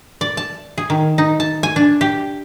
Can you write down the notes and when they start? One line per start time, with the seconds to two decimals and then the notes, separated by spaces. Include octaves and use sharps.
0.21 D5
0.37 A5
0.78 G#4
0.90 D#3
1.18 D#4
1.40 A5
1.63 G#5
1.76 D4
2.01 G4